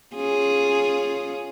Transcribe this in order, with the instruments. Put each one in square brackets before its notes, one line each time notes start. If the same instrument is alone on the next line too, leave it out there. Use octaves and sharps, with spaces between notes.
[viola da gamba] C#4 F4 G#4